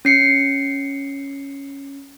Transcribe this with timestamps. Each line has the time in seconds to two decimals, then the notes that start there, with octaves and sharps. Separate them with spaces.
0.05 C#4 C7 C#7